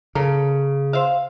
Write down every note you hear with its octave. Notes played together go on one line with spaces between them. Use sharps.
C#3 A4 A#4
C5 E5 F5